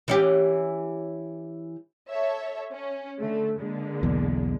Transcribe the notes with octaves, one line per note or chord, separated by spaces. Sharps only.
E3 C#4 G4
A4 C#5 E5
C#4
D3 A3
D3 G#3 A#3
B1 E2